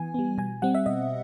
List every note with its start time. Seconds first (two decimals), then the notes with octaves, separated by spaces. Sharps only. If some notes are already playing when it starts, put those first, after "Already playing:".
Already playing: E3 B3 G#5
0.14 G3 B3
0.38 B2 G#5
0.62 G3 C4 F#5
0.75 E5
0.86 B2 D#5